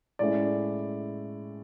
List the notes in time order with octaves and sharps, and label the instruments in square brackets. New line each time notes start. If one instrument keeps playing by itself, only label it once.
[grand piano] A2 G#3 C#4 E4 D5